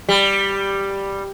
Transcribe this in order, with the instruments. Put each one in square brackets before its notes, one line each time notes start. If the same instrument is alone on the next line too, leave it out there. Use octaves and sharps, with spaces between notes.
[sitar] G3